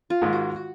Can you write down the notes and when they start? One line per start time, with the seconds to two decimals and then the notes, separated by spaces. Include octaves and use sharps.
0.10 F4
0.22 G#2 D#3 G#3
0.33 F#4
0.56 F#4